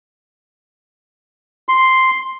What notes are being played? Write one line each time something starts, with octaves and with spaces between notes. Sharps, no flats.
C6